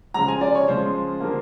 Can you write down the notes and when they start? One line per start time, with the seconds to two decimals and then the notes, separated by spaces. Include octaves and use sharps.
0.14 C#3 F3 G#3 A#5
0.28 G#5
0.41 D5
0.55 C#5
0.67 C#3 F3 G#3 C5
1.20 D3 F3 A#3